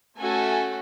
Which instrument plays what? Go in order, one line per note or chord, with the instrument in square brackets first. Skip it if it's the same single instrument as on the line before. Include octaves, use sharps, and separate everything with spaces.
[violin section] A3 C#4 F#4 A4 G#5